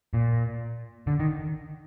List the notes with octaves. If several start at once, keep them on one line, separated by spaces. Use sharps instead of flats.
A#2
D3
D#3